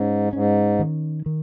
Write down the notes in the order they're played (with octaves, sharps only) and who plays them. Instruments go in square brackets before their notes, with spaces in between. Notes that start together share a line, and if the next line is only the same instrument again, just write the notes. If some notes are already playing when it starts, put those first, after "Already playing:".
Already playing: [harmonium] G#2 [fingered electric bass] C#4
[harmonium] G#2 [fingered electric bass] C#4
[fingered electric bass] D#3
D#3